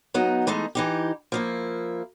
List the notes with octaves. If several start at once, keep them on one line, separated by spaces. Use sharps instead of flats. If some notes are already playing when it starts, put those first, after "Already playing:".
F#3 B3 D#4
E3 G#3 A3 D#4
E3 D#4 G4
F3 A#3 E4